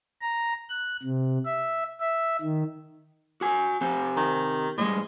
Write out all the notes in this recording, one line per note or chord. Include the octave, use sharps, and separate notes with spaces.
A#5
F#6
C3
E5
E5
D#3
F#4 G#5
C4 G4 G#5
D#3
A2 G3 G#3